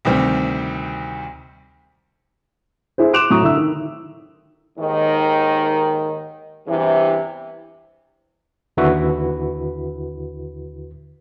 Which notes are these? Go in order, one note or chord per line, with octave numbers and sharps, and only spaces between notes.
D2 C3 D#3 G3 C4
E4 G#4 C5
C6 D6 F#6 D7 E7 F7
A2 F#3 A#5 C#6 D#6
D3 E4 E5 E6
D#3
D#2 G#2 D#3
E2 G2 C3 E3
D#2 D3 E4 F#4 B4